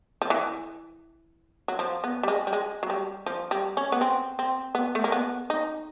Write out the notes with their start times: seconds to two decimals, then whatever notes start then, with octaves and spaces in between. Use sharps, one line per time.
0.22 F3
0.30 E3
1.68 F#3
1.79 F3
2.04 B3
2.23 G3
2.28 G#3
2.47 G3
2.53 G#3
2.83 F#3
2.90 G3
3.26 F3
3.51 G3
3.77 C#4
3.92 B3
4.01 C4
4.39 C4
4.75 B3
4.95 A3
5.04 A#3
5.12 B3
5.50 D#4